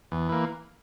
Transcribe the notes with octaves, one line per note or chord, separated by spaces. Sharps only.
E2
E3 A#3